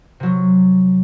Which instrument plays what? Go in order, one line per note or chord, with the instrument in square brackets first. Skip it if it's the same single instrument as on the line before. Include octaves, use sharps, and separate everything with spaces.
[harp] C3 F#3